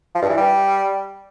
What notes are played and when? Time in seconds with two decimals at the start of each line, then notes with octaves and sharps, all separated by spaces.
0.15 F3
0.22 G2
0.30 E3
0.37 G3